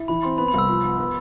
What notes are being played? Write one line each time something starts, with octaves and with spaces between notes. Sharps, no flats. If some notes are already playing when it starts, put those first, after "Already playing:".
Already playing: E4
E3 B5
C4 C6
B3 B5
B5
C2 E6
F3
B3
B3